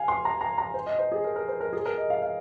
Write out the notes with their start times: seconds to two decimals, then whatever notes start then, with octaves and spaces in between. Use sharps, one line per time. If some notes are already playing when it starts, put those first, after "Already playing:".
Already playing: F5 G#5
0.08 C6
0.25 A#5
0.41 A#5
0.58 A#5
0.74 C5
0.86 D#5
0.99 C5
1.12 G#4
1.24 A#4
1.36 A#4
1.48 C5
1.60 A#4
1.73 G#4
1.86 A#4
1.98 D#5
2.10 F5
2.22 F5